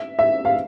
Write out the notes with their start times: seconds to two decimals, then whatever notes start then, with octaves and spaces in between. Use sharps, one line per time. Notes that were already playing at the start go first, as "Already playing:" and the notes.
Already playing: E5
0.19 E5
0.45 F5